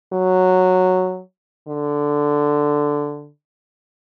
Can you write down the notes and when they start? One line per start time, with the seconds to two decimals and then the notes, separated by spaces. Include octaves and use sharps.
0.13 F#3
1.67 D3